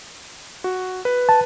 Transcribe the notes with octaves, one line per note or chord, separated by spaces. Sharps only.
F#4
B4
A5